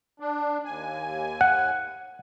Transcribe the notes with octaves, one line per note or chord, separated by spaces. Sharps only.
D4
D#2 G#5
F#5